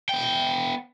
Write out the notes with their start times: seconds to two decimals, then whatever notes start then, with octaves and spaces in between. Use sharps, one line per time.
0.09 B3 G5